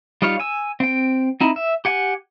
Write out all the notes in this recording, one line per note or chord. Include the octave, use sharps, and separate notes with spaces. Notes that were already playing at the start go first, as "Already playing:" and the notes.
G3 D#4 F4 C#5 F5
G#5 E6
C4 G5
C4 D#4 E4
E5
G4 F#5 G#5